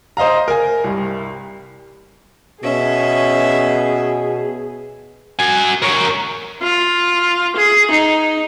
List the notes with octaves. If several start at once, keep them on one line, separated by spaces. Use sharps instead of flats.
C5 D#5 F5 A#5
A#4 G#5
C2 G2
B2 C#4 G#4 E5
F#4 G#5
A#4 C#5
F4
G#4
D#4